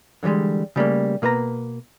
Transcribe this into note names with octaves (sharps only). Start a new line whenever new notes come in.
D3 E3 F3 G3 G#3
C#3 G3 A3 A#3
B2 A#3 B4 D5 A#5